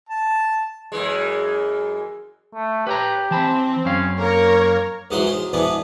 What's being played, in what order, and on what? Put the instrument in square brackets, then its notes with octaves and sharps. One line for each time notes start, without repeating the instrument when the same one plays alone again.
[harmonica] A5
[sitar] F#2 E3 G#3
[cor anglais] A3
[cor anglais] G4 [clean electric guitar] B4 C#5 A#5
[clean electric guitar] E3 A5 B5 [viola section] C4
[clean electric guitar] F#2 F5 [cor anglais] C#4
[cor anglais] A#3 [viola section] A#4 C#5
[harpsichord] C#2 G#2 E3 F#3 F#5 C6
B1 C5
G#2 B2 E3 B3 D4